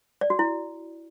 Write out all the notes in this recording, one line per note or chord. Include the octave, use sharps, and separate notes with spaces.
D5
F#4
E4